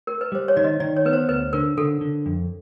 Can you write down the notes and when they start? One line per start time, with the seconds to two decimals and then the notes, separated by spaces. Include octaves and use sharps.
0.07 A#4
0.21 B4
0.32 G3 C5
0.48 C#5
0.56 D#3 D5
0.64 D#5
0.80 D#3 D5
0.97 C#5
1.05 B3 B4
1.13 C5
1.29 D2 B4
1.53 D3 A#4
1.77 D3 A4
2.01 D3
2.26 F2